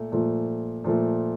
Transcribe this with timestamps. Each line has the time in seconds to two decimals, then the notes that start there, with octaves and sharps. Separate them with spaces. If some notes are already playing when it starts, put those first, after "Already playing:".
Already playing: A#2 A3
0.12 A#2 F3 A3
0.84 A#2 F3 A3